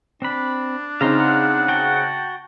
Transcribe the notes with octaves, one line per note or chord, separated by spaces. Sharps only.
C4 D4 B5
C#3 C4 D#4 F5 A#5 C6
F#5
F#4 G5 A5